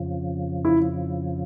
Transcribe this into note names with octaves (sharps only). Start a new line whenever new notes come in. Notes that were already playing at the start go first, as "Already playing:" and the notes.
Already playing: F2 C#3 F3
E4